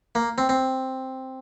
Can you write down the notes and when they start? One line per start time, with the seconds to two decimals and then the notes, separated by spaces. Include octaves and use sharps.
0.15 A#3
0.38 C4
0.49 C4